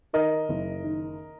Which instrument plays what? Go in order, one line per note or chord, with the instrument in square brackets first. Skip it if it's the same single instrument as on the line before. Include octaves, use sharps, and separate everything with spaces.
[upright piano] D#3 A#4 D#5
F#1
D#3